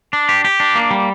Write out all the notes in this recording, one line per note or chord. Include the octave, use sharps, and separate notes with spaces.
D4
G4
G4
D4
A#3
G3